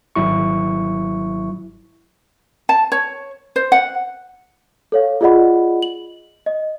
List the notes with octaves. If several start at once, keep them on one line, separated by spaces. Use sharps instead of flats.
G#1 F#3 E4 C#6
A5
C#5
C5
F#5
A4 C#5 F5
F4 G#4 D5 D#5 F#5 B5
F#7
D#5